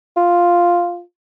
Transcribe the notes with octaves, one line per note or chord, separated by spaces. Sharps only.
F4